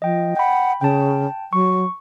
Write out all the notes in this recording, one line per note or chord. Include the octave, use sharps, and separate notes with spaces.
F3 D#5 G5
F#5 G5 B5
C#3 G5 A5
F#3 C#6